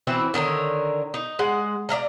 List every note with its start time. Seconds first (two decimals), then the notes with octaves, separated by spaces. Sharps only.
0.07 E3 C4 E4 F#4
0.34 D3 D#3 A#4 C#5
1.14 D#4
1.39 G#3 F#5
1.89 D5 E5 F5 A#5